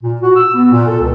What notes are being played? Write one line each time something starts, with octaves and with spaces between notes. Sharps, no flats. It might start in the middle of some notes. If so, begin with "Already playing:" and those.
A#2
F#4
E6
B3
A#2
A4
C#2